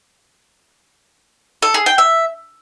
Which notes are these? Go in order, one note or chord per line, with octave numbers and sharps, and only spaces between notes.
A4
G#4
G5
E5